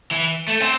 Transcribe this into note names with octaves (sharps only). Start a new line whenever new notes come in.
E3
A3
C4